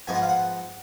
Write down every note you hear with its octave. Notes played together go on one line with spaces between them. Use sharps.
G#2 F3 B3 G#5
F#5
F5
F#5